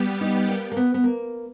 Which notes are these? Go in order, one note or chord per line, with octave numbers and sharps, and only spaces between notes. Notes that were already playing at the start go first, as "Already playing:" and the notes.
Already playing: G3 B3 G4
D#4
A#3
A#3
B3
B3
A#3